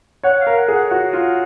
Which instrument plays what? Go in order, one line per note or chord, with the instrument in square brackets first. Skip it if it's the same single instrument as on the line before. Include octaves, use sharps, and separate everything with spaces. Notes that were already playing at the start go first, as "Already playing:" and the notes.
[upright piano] C#5 [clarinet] F#5
[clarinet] F5
[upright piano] A#4
[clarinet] F#5
[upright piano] G#4
[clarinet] F#5
[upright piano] F#4 [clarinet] F#5
[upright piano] F4